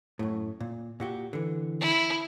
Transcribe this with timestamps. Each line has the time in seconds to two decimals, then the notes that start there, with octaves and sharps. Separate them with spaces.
0.19 F#2 A2
0.60 A#2
1.00 A#2 F#4 G4
1.33 D3 E3
1.81 E4